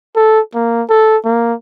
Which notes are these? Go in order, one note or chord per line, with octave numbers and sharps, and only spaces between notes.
A4
A#3
A4
A#3